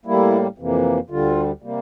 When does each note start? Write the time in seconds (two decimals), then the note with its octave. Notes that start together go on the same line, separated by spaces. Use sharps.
0.06 A2 G3 A#3 E4
0.58 F2 C3 E3 A#3
1.10 D2 D3 G3 F4
1.62 C3 G3 A#3